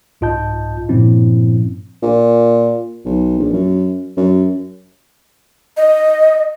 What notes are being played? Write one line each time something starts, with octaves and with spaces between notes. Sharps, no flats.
C2 G#2 F4 D#5 A5 G6
G2 A#2 F3 C4 C#4 E4
A#2
B1
A#1
F#2
F#2
D#5